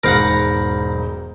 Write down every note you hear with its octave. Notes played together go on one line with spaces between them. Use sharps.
E1 G#2 A#4 C5 F5 F#5 B5 G6